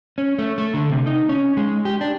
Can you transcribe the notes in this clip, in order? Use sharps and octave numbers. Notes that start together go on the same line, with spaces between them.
C#4
A3
A3
D3
C3
D#4
C#4
G#3
G4
D4